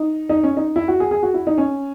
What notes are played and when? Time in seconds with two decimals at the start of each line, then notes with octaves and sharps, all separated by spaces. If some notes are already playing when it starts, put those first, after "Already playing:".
Already playing: D#4
0.29 D#4
0.43 C#4
0.57 D#4
0.76 E4
0.88 F#4
1.00 G#4
1.11 G#4
1.23 F#4
1.34 E4
1.47 D#4
1.58 C#4